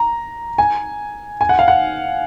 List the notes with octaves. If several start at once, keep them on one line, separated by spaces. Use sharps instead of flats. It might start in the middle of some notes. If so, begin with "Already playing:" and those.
Already playing: A#5
G#5
G#5
F#5
F5
F#5